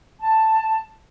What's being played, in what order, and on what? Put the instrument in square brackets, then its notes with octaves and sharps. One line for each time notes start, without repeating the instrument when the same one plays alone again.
[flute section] A5